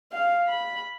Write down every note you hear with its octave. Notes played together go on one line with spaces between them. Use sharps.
F5
B5